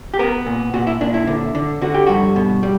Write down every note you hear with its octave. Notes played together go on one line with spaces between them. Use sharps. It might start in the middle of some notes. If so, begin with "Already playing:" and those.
G4
B3 A#4
A#2
A#2 F#4
E4
A#2 D4
E4
D3
D3
D3 F#4
G4
G2 F#4
B2
G3